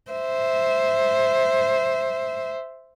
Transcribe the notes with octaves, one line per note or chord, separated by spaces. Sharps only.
C5 E5